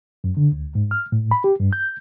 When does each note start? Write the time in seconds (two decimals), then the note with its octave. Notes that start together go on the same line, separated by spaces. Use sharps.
0.24 F#2
0.37 D3
0.52 D2
0.75 G#2
0.91 F6
1.12 A2
1.31 B5
1.44 G4
1.60 G2
1.73 G6